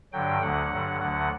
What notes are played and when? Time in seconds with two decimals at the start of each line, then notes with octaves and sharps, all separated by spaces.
0.13 G2 D3 F#3 G5
0.42 D2 D3 F#3 F#5
0.71 G2 D3 F#3
1.00 D2 D3 F#3 F#5